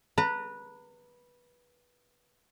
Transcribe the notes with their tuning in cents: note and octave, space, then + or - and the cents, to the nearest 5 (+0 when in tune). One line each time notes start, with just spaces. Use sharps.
B4 -15 A#5 -40